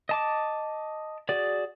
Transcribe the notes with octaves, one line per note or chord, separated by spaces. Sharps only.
D#5 A5 D6
F#4 G#4 D5